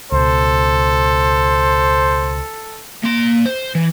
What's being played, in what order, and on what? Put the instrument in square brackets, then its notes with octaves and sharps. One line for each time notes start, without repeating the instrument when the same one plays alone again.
[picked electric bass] C#2 B2 [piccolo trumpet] A4 [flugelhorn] C5
[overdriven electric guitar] A#3 C6
C5
E3